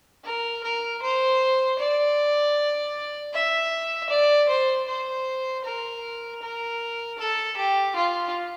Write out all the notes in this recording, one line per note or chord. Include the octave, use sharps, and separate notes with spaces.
A#4
A#4
C5
D5
E5
D5
C5
C5
A#4
A#4
A4
G4
F4